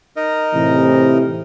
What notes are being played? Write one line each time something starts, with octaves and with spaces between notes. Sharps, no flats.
D#4 A#4 D#5
A2 C3 E3